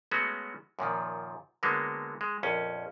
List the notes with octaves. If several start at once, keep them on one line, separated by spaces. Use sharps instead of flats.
F#3 G#3 A3 B3 C#4 F#4
F#2 A#2 D#3 F3
D3 F#3 G#3 A#3 B3
G#3
A#1 F2 C#4